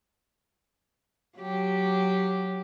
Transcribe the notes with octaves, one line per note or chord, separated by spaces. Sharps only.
F#3 G4